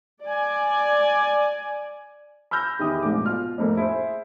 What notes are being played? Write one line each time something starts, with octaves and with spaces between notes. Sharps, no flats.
D5 G#5
B5 E6 F6 G6 A#6
E2 D#3 E4 G4 D#6
A#1 G#2 A3 C4 D6
B2 F4 F6
F2 A2 A3 A#3
E4 G#4 C5